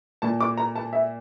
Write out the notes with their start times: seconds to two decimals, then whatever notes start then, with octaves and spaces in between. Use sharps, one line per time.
0.22 A#2 A5
0.41 D6
0.57 A#5
0.76 A5
0.93 E5